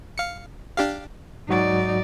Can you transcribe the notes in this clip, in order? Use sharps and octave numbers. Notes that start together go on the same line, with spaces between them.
F5 C#7
D4 G4 F5
G#2 F#3 D#4 F#4 D5